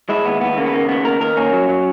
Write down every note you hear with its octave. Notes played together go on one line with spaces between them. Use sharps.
G#3 E4
D#2 B3
D#2 B3
C#3 A#3
B3
D#2 A#3
C#3 B3
D#2 A#4
D#2 A#4
A#3 C#4
F#3
F#3